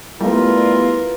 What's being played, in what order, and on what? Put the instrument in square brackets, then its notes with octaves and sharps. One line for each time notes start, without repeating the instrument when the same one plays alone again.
[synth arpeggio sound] G3 A3 B3 [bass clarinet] E4 [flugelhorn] F4 [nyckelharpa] A#4 B4